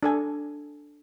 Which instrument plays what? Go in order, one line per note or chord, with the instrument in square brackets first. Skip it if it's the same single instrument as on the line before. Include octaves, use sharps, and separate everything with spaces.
[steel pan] D4 A4 G#5